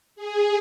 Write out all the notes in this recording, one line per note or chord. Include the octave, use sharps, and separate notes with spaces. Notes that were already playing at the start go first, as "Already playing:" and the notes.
G#4